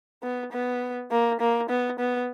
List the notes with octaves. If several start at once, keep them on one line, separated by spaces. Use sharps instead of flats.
B3
B3
A#3
A#3
B3
B3